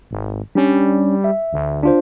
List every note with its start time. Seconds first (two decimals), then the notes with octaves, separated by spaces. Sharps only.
0.11 G#1
0.55 G3 C#4 D4
1.24 E5
1.53 D2
1.83 D4 F4 C5